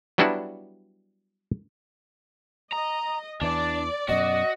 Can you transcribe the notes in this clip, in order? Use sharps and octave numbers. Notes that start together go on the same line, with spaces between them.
F#3 G3 B3 D4 E4 F#4
D#5 A#5
E2 E3 D4 D5
F#2 B2 F#4 D#5